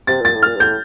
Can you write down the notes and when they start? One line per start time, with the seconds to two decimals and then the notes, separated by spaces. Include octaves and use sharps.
0.07 C3 A6
0.21 A#2 A6
0.34 A2
0.43 A#2 F6
0.56 G2
0.60 A2 G6